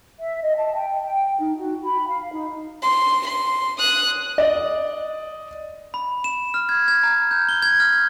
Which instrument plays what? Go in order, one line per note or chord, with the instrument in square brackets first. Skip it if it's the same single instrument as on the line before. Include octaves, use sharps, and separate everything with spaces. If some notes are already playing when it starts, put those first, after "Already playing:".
[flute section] E5
D#5
A5
G5
G5
D#4
F#4
B5
F5
D#4
[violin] C6
C6
D#6 F#6
[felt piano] D5 D#5
[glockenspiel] B5
E7
F6
G#6
G#6
A#5
G6
G7
G#6
F6
G#6